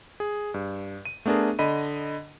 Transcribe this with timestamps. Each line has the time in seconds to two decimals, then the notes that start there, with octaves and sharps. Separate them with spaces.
0.20 G#4
0.54 G2
1.05 D#7
1.26 A3 B3 D4 G#4 A#4
1.59 D3 D#5 B5 D#7